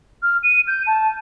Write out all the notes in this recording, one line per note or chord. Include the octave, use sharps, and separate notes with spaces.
F6
D#7
G6
A5